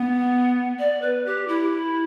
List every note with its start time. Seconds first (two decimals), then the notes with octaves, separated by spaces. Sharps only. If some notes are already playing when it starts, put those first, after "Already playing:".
Already playing: B3
0.79 D5
1.02 B4
1.26 G4
1.48 E4